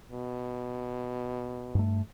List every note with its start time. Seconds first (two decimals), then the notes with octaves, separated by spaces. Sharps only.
0.12 B2
1.75 G2 A3